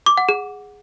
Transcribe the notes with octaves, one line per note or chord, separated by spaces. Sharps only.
D6
F#5
G#4